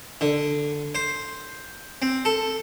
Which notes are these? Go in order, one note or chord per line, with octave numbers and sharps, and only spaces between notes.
D3
C5
C4
A4